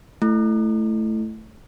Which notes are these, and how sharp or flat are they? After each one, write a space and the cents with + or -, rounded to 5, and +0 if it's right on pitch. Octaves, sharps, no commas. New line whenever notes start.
A3 +0 E4 +15